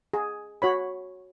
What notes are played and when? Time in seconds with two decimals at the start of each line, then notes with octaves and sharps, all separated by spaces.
0.14 G#4
0.62 F#4 C#5 B5